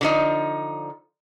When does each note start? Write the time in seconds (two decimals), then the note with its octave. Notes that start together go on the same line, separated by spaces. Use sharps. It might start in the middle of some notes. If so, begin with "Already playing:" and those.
0.01 D3 F3 D#4